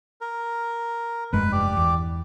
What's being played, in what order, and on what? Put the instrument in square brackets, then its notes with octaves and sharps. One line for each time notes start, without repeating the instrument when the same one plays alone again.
[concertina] A#4
[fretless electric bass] F1 G2 G#3 [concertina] B4
[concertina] G4 D5
[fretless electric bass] E2